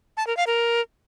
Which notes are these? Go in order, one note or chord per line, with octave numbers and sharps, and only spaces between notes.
A5
A#4
F5
A#4